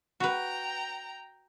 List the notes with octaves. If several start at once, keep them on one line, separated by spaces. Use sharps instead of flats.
F#4 B4 G5 A#5